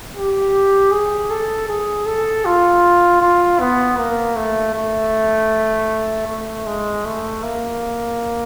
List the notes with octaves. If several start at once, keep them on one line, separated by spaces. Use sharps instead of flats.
G4
G#4
A4
G#4
A4
F4
F4
B3
A#3
A3
A3
A3
G#3
A3
A#3